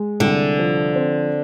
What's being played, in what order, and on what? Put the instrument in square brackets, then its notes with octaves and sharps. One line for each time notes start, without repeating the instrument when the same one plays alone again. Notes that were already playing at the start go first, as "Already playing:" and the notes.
Already playing: [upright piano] G#3
[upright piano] C2 [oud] D3
[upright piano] F3
C4